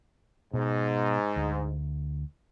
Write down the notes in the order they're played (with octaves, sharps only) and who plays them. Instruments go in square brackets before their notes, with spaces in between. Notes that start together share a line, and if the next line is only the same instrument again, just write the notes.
[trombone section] G#2 [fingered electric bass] B2
[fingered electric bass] D2